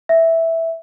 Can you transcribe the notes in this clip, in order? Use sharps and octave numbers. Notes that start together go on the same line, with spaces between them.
E5